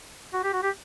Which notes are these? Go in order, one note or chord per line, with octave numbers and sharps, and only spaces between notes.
F#4
G4
F#4
G4